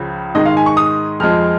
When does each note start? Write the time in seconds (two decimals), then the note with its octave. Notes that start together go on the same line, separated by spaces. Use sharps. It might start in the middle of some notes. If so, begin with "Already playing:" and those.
Already playing: C#2 C#3 F3
0.35 G#2 D#3 G#3 D#5
0.45 F5
0.57 G#5
0.66 C#6
0.77 D#6
1.20 F2 F3 G#3 F6